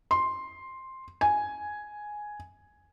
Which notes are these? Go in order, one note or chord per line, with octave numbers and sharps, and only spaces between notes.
C6
G#5